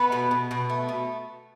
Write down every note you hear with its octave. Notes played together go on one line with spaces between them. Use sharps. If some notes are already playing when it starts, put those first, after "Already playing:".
Already playing: A3 B3 B4
B2
B2
B2
A3
B2